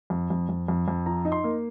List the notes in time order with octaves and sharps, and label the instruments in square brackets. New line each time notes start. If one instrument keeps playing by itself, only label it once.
[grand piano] F2
F2
F2
F2
F2
F3 A#5
D#4
C6
A#3